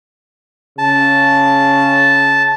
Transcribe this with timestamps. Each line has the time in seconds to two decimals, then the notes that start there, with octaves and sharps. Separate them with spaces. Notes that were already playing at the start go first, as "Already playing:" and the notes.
0.78 C#3 A5